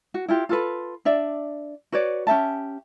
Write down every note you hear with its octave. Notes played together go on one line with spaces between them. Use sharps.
F#4
E4 F4 G4
F4 A4 B4
D4 D5 E5
F#4 B4 C#5 D5
C#4 G4 E5 A5